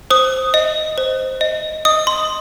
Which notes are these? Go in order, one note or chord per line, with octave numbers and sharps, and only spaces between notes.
C5 D#6
D#5
C5
D#5
D#5 D#6
C6